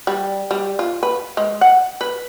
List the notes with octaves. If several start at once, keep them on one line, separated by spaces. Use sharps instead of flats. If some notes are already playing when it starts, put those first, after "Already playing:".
G3
G3
F4
B4
G#3
F#5
B4